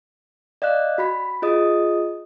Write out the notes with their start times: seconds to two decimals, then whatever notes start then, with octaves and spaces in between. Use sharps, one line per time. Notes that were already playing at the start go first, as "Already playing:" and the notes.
0.62 D5 D#5 F5 F#6
0.98 F#4 B5 B6
1.42 F4 G#4 D#5 D#6